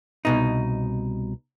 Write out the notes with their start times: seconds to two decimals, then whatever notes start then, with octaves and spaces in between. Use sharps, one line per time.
0.25 C2 B2 D#4